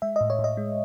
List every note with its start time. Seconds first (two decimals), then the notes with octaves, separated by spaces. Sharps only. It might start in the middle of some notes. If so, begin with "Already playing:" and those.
0.02 G#3 E5
0.16 A2 D#5
0.30 C#5
0.39 A2
0.44 D#5
0.57 G#3